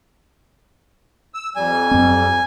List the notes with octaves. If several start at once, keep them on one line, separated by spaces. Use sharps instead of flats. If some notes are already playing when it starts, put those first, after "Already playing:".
E6
F2 G3 G#5
F#2 C4